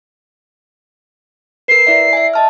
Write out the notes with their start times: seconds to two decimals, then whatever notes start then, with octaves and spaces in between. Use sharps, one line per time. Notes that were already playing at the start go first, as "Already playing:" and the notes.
1.68 A#4 B4 C7
1.87 E4 D5 E5
2.13 E5 G#5
2.34 D#5 A5 F6